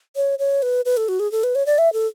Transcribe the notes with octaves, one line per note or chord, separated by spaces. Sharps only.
C#5
C#5
B4
B4
A4
F#4
G#4
A4
B4
C#5
D5
E5
A4